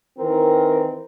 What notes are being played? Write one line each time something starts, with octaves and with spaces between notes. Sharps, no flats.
D#3 E3 C4 A#4